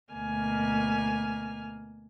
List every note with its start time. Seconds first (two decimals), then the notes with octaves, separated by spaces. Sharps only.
0.11 D2 B2 A#3 G#5 F6